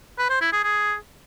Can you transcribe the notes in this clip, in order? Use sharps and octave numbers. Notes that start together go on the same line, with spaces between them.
B4
C5
E4
G#4
G#4